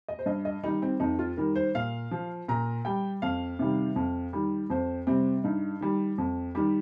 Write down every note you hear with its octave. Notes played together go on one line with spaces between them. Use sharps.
D#5
C5
G2 D#5
D#5
D#3 G3 D#4
C4
F2 D#4
F4
D#3 G3 A#4
C5
A#2 F5
F3
A#2 A#5
G3 G5
F2 F5
C3 D#3 G3
F2
D#3 G3
F2 C5
C3 G3 C4
G2 D#4
D#3 G3
F2
D#3 G3 G4